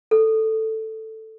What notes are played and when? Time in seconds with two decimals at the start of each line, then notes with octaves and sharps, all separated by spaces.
0.11 A4